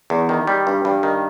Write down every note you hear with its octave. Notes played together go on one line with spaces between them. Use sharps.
E2
D#3
G3
G2
G2
D#3